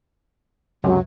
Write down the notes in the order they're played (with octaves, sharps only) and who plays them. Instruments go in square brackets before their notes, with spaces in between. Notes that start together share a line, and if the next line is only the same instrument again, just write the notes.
[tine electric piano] C#2 F#2 C3 [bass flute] F#3